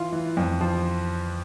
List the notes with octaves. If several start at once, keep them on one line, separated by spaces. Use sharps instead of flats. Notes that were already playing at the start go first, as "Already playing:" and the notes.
Already playing: E3 F4
E3
F2
F3